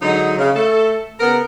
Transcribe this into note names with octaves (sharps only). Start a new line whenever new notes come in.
D3 F#3 G#3 D#4
C#3
A3 A4
C#3 B3 A#4